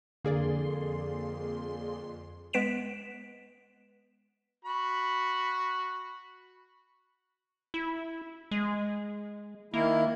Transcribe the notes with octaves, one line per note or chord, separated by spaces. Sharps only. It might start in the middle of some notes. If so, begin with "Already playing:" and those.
F2 D3 A#3 G#4 D5 C6
G#3 B3 B4 B6 D7 E7
F#4 B5
E4
G#3
D#3 A#3 E4